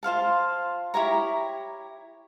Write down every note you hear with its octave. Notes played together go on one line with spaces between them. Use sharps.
F4 C5 F5 A5
E4 G4 C#5 A#5